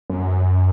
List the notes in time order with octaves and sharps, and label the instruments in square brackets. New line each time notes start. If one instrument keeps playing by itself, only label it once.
[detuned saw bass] F#2